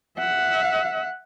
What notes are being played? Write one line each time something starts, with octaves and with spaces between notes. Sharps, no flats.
E5 F#5